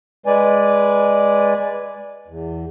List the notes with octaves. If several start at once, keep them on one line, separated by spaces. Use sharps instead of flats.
G#3 B4 D5 G#5
E2